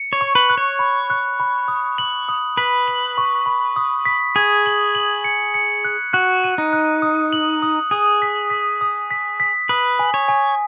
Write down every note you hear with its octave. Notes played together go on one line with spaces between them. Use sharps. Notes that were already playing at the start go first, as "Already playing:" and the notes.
Already playing: C#7
C#5
C#6
B4
F#6
C#5
B5
F#6
B5
D#6
F#7
D#6
B4 B6
F#7
C#6
B5
D#6
B6
G#4 G#6
F#7
F#7
C#7
C#7
F#6
F#4 F#6
D#7
D#4
F#6
D#6
F#7
D#6
G#4 D#6
B6
B6
D#6
B6
B6
B4 D#6
G#5
C#5
G#5